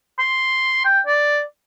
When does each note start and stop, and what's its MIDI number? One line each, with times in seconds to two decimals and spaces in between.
0.19 0.83 84
0.85 1.00 79
1.06 1.42 74